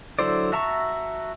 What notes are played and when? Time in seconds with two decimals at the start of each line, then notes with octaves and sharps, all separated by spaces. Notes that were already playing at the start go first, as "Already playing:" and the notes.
0.19 D3 F#3 E4 C5 D5
0.52 F#4 E5 A5 A#5 C#6